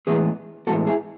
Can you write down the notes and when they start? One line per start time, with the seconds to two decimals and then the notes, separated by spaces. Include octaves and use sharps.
0.07 A2 E3 G#3 B3 G#4 B4
0.67 A2 E3 G#3 B3 F#4 A4
0.87 E4 G#4